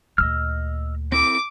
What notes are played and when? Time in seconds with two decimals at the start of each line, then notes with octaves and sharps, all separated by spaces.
0.18 D2 A#2 D#5 E6 F6
1.12 C4 E4 A4 D6